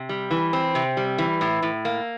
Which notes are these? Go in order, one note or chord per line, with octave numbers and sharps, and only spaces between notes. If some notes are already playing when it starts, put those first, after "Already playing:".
Already playing: C3
G3
E3
C4
C3
G3
E3
A2
A2
A#3